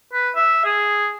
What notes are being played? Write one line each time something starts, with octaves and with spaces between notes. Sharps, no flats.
B4
E5
G#4